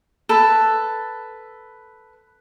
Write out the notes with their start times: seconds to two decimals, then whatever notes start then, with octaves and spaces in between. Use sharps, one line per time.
0.29 A4 B4